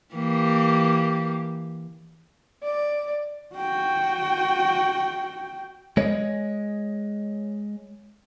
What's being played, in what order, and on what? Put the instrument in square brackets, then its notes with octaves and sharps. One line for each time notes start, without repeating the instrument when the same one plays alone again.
[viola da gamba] E3 A#3 G4
[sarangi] D5
[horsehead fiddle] F#4 G5
[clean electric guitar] G#3 C#5 D#5